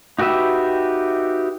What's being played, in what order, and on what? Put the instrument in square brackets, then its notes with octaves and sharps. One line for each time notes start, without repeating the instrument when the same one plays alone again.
[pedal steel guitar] D#4 F#4 G4 B4 E5